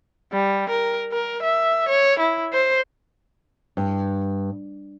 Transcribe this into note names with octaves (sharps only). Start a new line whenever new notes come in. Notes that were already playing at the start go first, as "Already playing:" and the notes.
G3
A#4
A#4
E5
C#5
E4
C5
G2